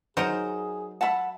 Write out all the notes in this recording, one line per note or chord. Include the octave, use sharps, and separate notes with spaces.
F#3 D#4 G#4 A#4 C5
E5 F#5 A5 B5